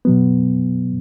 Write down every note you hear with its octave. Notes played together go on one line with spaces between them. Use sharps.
B2 F#3 B3